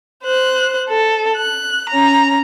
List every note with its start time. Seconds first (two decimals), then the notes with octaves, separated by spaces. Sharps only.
0.24 C5 F#6
0.89 A4
1.36 F#6
1.89 C#4 A#5